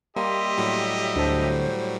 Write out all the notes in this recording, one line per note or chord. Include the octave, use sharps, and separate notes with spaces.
G3 A#3 G4 D#5 E5 C6
A2 F#3 G3
D2 A4 C5